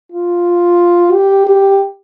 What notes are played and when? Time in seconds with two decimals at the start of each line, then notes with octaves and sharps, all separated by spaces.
0.12 F4
1.13 G4
1.47 G4